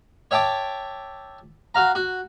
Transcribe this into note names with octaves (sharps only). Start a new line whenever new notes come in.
C#5 E5 G5 A5 D6
F#4 F5 A#5
F#4